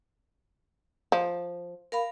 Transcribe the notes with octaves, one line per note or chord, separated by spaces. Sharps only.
F3
A#4 F5 B5